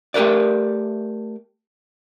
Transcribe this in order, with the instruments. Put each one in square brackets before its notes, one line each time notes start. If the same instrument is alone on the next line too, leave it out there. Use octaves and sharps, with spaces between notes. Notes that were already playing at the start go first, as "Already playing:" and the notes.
[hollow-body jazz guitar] A3 G4 A#4 B4 D5